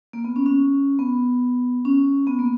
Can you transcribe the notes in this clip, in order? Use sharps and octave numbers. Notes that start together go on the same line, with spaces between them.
A#3
B3
C#4
C#4
B3
C#4
B3
A#3